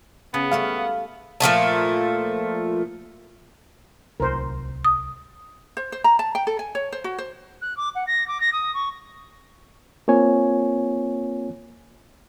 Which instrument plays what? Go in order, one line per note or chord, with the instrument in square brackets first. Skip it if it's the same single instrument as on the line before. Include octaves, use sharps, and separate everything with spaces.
[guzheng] C#3 [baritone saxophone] B3
[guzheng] G3 A3 A4 [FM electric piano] F5
[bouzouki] A#2 F3 A3 A5
[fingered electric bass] D1 C2 [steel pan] A#4 C5
[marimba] D#6
[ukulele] C5
C5
A#5
A5
G5
A4
G#5
C#5
C5
F#4
C5
[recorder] F#6
D6
F#5
A#6
D6
A#6
D#6
C#6
[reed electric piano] A#3 C4 F4 C#5 G#5